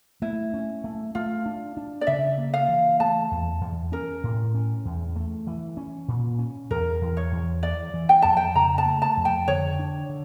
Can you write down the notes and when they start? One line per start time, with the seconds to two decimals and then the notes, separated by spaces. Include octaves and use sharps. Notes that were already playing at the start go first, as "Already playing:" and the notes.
0.22 A3 E4
0.54 C#4
0.84 A3
1.15 A3 F4
1.46 D4
1.77 D4
2.01 D5
2.07 C#3 E5
2.38 A#3
2.54 F5
2.69 E3
3.00 A3 A5
3.31 E2
3.61 E2
3.92 C#4 A#4
4.23 A2
4.55 C#4
4.85 E2
5.16 A3
5.47 E3
5.77 C#4
6.08 A#2
6.39 C#4
6.70 E2 A#4
7.01 E2
7.17 C#5
7.31 E2
7.63 E3 D5
7.94 E3
8.09 G5
8.22 F2 A5
8.37 G5
8.55 C#3 A#5
8.78 A5
8.86 A3
9.02 A5
9.17 F2
9.25 G5
9.48 D3 C#5
9.79 D4
10.09 D3